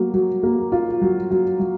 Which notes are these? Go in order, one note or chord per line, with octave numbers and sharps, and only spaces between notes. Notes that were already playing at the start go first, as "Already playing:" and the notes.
Already playing: F#3 A#3
F#3
A#3
F4
F#3
F#3
F#3